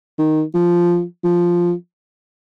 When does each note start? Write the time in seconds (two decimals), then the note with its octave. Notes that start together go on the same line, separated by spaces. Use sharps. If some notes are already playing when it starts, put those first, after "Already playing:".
0.19 D#3
0.54 F3
1.24 F3